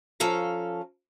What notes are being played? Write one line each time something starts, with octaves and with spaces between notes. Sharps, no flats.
F3 C#4 A4 F5 A#5